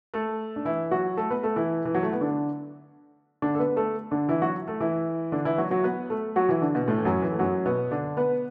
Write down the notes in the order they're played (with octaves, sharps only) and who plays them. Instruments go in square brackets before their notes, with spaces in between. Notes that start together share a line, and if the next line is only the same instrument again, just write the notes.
[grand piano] A3 A4
D4
E3 E4
F#3 F#4
A3 A4
B3 B4
A3 A4
E3 E4
E3
F#3
A3
B3
D3 D4
D3 D4
A4
B3 B4
A3 A4
D3 D4
E3 E4
F#3 F#4
A3 A4
E3 E4
D3 D4
E3 E4
F#3 F#4
F#3 F#4
B3 B4
A3 A4
F#3 F#4
E3 E4
D3 D4
B2 B3
A2 A3
E3
F#2 F#3
E3
A3
F#2 F#3
B2 B3
D3 D4
B3 B4